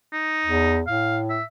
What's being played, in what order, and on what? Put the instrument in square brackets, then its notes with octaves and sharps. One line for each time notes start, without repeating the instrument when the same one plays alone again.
[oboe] D#4
[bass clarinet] E2
[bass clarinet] A2 [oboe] F5
[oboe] E5